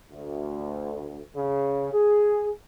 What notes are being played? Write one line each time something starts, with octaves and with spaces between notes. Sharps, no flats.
D2
C#3
G#4